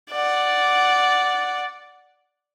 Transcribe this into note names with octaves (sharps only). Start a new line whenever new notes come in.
D5 F#5